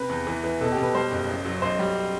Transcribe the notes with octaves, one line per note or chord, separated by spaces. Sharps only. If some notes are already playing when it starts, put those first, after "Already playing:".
Already playing: C3 B4
E2
E3
E3
B2 A4
G4
B2
B4
G3 C5
F#1
A1
F#3
B1 C5
G3